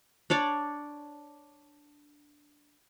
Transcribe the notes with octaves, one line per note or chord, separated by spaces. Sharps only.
D4 C#5 D5 D6